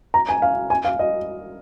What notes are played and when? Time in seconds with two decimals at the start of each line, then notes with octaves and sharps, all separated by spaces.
0.14 A#5
0.29 G#5
0.42 F5
0.70 G#5
0.85 F5
0.99 D#5